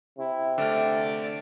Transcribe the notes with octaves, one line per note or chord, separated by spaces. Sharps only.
C3 E4
D3 A3 D5 F6